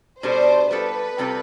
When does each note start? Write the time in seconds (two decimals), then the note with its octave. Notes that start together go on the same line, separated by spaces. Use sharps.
0.23 B2 G3 D4 A4 C5
0.71 G3 B3 F4 A4 B4
1.18 C3 G3 C4 F4 A4